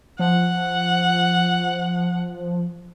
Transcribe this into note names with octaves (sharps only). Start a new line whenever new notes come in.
F3 F#5